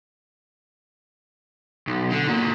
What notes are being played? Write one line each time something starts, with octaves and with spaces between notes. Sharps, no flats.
B1
D3
G#2 A#3